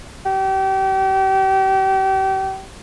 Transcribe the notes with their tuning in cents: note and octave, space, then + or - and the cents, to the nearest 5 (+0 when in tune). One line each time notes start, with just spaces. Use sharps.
G4 -35